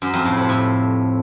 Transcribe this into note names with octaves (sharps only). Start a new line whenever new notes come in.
F#2
F2
A2
C3
A2